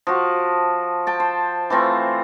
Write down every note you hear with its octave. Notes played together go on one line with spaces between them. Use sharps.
F3 F#4
G5 A5
C5
E3 A3 C4 F4